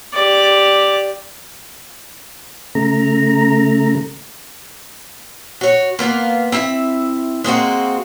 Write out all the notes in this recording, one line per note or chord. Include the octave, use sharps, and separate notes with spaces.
G4 D5
C#3 A3 A#5
F#4 C#5
A#3 B3 F4
C4 E4 E5
G#3 A#3 C4 F#4